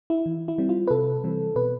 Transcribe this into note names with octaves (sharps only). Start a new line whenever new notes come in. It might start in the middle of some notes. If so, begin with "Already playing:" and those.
E4
E3
E4
G3 C4
F4
B4
C3 A4
E3 G3 C4
B2 B4